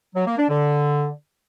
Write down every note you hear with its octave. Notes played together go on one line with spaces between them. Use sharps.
F#3
A#3
D4
D3